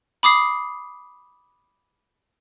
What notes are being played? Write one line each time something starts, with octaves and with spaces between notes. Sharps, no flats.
B5 D6 D#6 C7